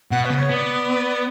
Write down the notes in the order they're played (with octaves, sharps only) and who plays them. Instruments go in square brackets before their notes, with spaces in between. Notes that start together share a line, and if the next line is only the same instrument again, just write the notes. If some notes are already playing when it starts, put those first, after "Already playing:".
[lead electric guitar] B2 [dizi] F#5
[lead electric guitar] C#3 [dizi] B4
[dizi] C#5
[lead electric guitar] B3 [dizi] D5